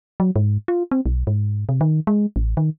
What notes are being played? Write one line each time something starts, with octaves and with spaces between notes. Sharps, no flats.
F#3
G#2
F4
C4
B1
G#2
C3
D#3
G#3
A1
D#3